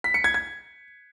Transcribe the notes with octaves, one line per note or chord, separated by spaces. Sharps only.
B6
C#7
G#6
G#6